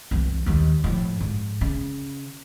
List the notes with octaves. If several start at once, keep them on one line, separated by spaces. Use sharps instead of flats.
C2 E3
D#2 D#3
A2 F3
G#2
C#3